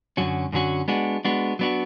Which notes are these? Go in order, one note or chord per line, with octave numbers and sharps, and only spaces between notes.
F#2 D3 F#3 C#4 F#4
F#2 D3 F#3 C#4 F#4
G#3 B3 D4 F#4
G#3 B3 D4 F#4
F#3 B3 D4 F#4